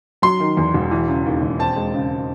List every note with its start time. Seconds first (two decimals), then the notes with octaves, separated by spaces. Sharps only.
0.22 F#3 C6
0.40 D#3
0.57 E2
0.74 E1
0.91 E3
1.08 C#3
1.26 D#2
1.42 E1
1.59 C4 A5
1.76 G#3
1.94 C#3